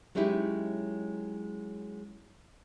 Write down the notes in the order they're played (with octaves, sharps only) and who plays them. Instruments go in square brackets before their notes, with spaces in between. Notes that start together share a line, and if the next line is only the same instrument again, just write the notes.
[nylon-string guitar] F#3 G#3 C#4 D#4 E4 G4